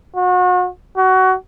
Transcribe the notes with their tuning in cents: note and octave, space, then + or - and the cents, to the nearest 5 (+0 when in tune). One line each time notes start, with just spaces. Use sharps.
F#4 -35
F#4 +20